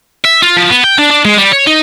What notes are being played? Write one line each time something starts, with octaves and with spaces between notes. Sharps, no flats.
E5
F4
F3
B3
G5
D4
D4
G#3
G3
C#5
D#4